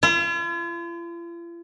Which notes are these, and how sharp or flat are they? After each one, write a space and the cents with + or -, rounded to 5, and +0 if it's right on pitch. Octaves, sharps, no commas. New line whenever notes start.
F4 -45